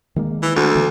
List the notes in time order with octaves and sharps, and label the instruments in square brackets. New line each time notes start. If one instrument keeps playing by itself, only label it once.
[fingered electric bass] D#3 G#3 A#3
[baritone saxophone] E3
D2
[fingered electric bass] D3 E3 A#3